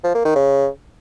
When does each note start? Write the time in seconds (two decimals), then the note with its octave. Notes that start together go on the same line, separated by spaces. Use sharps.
0.04 F3
0.15 A#3
0.25 D#3
0.36 C#3